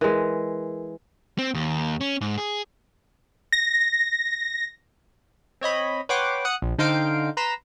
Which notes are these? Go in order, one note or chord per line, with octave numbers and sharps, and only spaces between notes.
E3 G#3 A#4
C4
D#2
C#4
G#2
G#4
A#6
C4 C#5 D#5 B5
B4 C#5 F#5 G5 C6 D6
F#5 D#6 F#6 C#7
A#1
D3 D#4 C5 F5 G5 D7
B4 A#5 C6 B6 E7